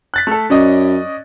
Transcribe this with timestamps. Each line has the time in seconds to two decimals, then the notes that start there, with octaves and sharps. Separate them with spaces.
0.14 F#6 A6 B6
0.27 A3 A4
0.50 F#2 C#4 D5 D#5